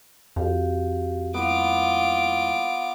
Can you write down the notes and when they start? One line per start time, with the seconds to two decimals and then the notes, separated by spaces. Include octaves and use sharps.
0.36 F2 F#4 G4 F5
1.34 G3 A#3 B3 E4 F4 D6